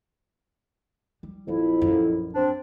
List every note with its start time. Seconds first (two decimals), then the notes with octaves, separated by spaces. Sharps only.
1.23 G3
1.47 A#1 F2 F#3 E4
1.82 A#1 F#2
2.35 C4 D4